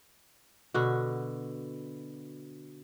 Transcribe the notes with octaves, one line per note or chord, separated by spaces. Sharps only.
B2 D3 F#4